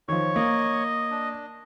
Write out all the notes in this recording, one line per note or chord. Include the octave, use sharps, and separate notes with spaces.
D#3 F3 C#5 C#6
A#3 D#5
D4